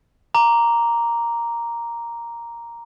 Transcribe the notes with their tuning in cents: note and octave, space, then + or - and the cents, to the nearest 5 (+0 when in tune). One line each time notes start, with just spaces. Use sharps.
A#5 +0 D6 -10